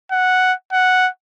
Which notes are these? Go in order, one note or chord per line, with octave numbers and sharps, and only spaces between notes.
F#5
F#5